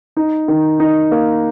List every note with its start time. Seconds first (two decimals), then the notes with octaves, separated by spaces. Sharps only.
0.17 D#4
0.48 D#3
0.80 D#4
1.11 A#3